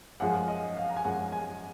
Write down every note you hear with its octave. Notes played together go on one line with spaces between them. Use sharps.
F#2 F3 G#3 F#5
D#5
F5
A#5
G#5
F#2 F3 G#3 F#5
G#5